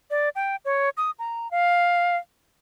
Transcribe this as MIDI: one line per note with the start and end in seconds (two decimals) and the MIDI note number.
0.10 0.29 74
0.35 0.56 79
0.65 0.89 73
0.97 1.11 87
1.19 1.50 82
1.51 2.16 77